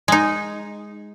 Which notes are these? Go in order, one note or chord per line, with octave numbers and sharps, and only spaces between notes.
G#3 D#4